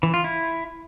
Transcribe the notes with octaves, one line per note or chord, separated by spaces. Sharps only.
E3
F4
E4